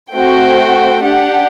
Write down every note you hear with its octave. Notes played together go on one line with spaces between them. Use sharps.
A3 C4 F#4 G5
D4 G4 F#5